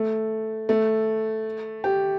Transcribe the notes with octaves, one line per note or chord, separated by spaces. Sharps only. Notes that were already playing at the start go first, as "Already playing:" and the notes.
Already playing: A3
A3
G4